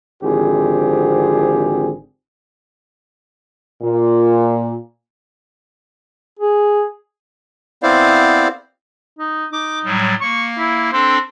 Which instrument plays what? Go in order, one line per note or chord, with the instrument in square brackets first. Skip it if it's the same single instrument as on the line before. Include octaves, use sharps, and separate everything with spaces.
[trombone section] G#1 D3 F3 C4 G4 G#4
[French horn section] A#2
[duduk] G#4
[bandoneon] B3 C4 E4 C5 D5 F5
[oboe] D#4
[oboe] D#4 [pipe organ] D6
[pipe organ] A2 F#3 G3
[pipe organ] A#3 [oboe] C#6
[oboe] E4
[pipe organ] C4 D4 A4 [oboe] C5